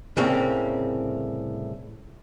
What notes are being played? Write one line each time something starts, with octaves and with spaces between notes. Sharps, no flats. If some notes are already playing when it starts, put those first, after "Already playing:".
C2 A2 C#3 A#3 C4 C#4